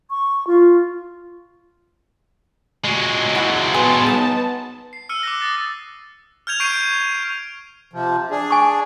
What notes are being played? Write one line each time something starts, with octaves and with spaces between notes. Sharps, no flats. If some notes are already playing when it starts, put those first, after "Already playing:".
C#6
F4
F#3 G#3
E4 F#4 F#5
B3 G#4 A5 C6 D#6
D#4 D#6
C7
E6 F6 C#7 D#7
D6 F#6 A#6
D#6 A6
F6 G6 G#6 F7
C#6 G6 C7 D7 D#7
C3 F3
D4 G#4
G#5 C#6